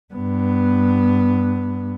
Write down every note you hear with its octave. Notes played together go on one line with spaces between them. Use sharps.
G2 B3